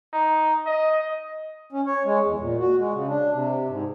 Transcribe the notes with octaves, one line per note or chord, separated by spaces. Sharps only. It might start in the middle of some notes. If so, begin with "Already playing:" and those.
D#4
D#5
C#4
C#5
G#3
E2
A#2
F#4
G#3
C#3
D4
C3
G#2